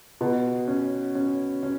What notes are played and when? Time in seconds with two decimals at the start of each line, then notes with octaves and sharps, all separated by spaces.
0.21 B2
0.68 C#4
1.15 C#4
1.63 C#4